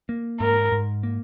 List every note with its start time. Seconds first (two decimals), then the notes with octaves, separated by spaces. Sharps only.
0.09 A#3
0.40 G#2 A#4
0.72 G#2
1.03 A#3